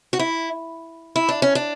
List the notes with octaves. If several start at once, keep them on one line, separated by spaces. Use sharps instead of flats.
F#4
E4
E4
D4
C#4
D4